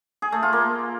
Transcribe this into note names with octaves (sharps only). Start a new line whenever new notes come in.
G#4
A3
F4
A#3